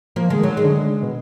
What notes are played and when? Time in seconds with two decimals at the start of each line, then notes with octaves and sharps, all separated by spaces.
0.16 F3 A#3
0.29 D3 G#3
0.39 D#3 F#3
0.57 G#3
0.63 D3
1.02 B2